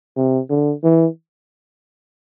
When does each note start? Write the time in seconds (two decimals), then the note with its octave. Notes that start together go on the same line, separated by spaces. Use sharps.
0.17 C3
0.50 D3
0.84 E3